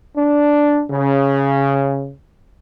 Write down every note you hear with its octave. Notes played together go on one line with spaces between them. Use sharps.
D4
C#3